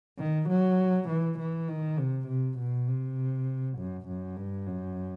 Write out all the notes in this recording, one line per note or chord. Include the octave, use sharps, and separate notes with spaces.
D#3
F#3
E3
E3
D#3
C3
C3
B2
C3
F#2
F#2
G2
F#2